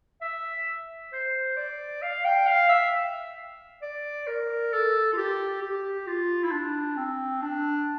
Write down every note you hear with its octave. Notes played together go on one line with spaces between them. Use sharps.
E5
C5
D5
F5
G5
F5
E5
D5
A#4
A4
F4
G4
G4
F4
E4
D4
C4
D4